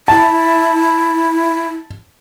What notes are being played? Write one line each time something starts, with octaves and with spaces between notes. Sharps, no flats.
E4 A5